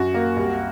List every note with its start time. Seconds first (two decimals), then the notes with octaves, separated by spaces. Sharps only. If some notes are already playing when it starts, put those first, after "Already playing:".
Already playing: F#2 F#4
0.14 A#3
0.37 C2